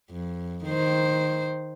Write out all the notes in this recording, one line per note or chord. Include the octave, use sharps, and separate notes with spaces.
F2
D#3 C5